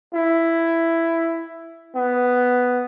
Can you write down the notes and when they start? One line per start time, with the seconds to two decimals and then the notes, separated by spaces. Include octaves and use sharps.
0.14 E4
1.96 B3